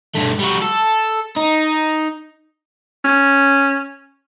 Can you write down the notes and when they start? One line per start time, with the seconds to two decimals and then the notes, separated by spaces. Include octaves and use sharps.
0.15 G2 A3
0.40 G3 F#4
0.62 A4
1.36 D#4
3.05 C#4